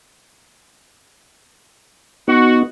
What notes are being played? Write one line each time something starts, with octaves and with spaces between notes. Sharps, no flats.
B3 D#4 F#4